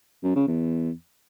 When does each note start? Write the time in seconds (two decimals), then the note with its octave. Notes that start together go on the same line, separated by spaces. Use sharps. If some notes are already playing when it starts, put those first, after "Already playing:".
0.23 F#2
0.35 C#3
0.47 E2